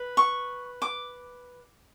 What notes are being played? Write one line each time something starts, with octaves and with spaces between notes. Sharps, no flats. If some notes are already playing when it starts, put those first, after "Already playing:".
Already playing: B4
C#6
D6